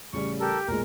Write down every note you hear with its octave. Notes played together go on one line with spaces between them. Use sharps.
A1 C#3 G3 C#6
G4 A4 A#4
B1 A#2 G#3 A#4